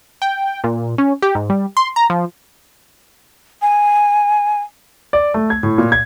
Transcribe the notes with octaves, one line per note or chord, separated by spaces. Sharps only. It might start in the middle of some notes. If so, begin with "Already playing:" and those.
G5
A#2
C#4
G4
G#2
G3
C6
A#5
F3
G#5
D5
A3
G#6
A2
A#2
G#6